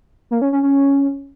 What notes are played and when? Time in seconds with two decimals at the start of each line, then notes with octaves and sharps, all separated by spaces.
0.31 A#3
0.42 C#4
0.52 C#4
0.63 C#4